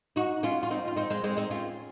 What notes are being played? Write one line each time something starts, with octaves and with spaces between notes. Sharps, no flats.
D#4 F#4
C#4 F4
F4
C4 D#4
F4
C4 D#4
G#3 C4
G#3 C4
C4 D#4
C#4 F4